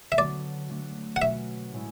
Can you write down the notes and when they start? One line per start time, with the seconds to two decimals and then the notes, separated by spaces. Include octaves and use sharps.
0.12 E5
0.18 D3 F#3 B3 F#4 D5
0.70 D3 A3 D4 F#4
1.16 F#5
1.21 B2 F#3 C#4 F#4 E5
1.71 A2 G#3 C#4 E4